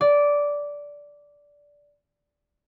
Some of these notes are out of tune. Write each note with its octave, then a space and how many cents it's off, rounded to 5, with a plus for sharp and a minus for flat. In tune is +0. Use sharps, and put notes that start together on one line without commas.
D5 -10